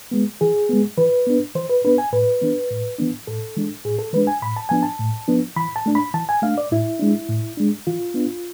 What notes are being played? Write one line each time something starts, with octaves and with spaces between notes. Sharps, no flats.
G#3 B3
E3 G#4
G#3 B3
E3 B4
B3 D4
E3 C5
B4
B3 D4 B4
G#5
A2 B4
E3 B3 D4
A2
E3 B3 D4
A2 A4
E3 G#3 D4
A2 G#4
A4
E3 G#3 D4 B4
G#5
A2 B5
A5
F3 B3 D4 G#5
A5
A2
F3 B3 D4
E3 B5
A5
A3 D4
B5
E3 A5
G#5
A3 D4 F5
D5
A2 E4
G#3 D4
A2
G#3 D4
E3 F4
B3 D4